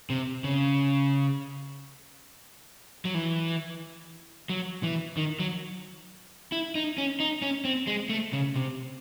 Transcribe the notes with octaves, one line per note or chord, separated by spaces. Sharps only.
C3
C#3
F#3
E3
F#3
E3
D#3
F#3
E4
D#4
C#4
D#4
C#4
C4
G#3
A3
C#3
C3